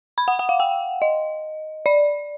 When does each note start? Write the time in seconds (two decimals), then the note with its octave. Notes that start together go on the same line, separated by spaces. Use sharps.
0.18 B5
0.28 F#5
0.39 F#5
0.49 F5
0.60 G5
1.02 D#5
1.86 D5